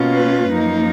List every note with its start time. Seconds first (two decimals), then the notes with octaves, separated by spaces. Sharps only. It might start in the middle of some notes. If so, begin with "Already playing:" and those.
Already playing: B2 A#3 C#4 F4
0.14 B4
0.50 F#2 F3 A#3 D#4